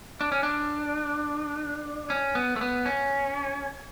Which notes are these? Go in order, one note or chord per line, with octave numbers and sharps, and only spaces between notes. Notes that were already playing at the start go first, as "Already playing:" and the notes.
D4
C#4
D4
C#4
B3
A3
B3
C#4